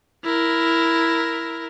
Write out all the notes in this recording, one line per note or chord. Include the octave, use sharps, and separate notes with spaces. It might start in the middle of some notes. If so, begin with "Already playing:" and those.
E4 A#4